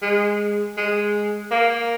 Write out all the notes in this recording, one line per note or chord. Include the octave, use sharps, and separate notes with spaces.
G#3
G#3
A#3